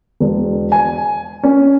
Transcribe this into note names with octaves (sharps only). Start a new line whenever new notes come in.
E1
G#5
C#4